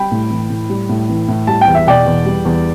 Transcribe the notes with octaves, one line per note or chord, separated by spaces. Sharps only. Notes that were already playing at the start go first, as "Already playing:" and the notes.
Already playing: G3 G5 B5
A2
E3
A2
G3
A2
E3
A2
G3 A5
G5
E2
E5
B2 D5 G5
E2
G3
E2